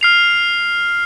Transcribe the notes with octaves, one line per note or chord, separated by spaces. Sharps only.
F6 C7 F7